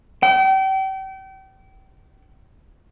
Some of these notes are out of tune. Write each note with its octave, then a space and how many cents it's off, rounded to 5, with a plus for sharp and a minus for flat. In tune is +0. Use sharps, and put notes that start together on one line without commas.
G5 -35